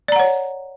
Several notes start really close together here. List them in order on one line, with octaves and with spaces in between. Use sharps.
D5 A#5 F#5 C#5